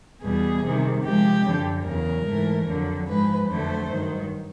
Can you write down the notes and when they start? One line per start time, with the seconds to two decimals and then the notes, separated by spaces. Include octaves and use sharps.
0.23 E2 B2 G3 G#4
0.64 C3 D#3 G3
1.04 C3 F3 G#3 G4
1.45 F#2 D3 F3
1.85 E2 C#3 F#3 A#4
2.27 G#2 E3 A3
2.66 F2 D3 F#3
3.08 G#2 F3 G#3 B4
3.48 F2 D3 F#3 A3 C5
3.89 G2 D#3 F#3